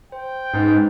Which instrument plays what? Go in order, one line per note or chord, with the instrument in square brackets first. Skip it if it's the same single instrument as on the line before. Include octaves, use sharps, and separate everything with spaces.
[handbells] C5 [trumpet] G5
[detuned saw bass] G#2 [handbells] C#4 D#4 B4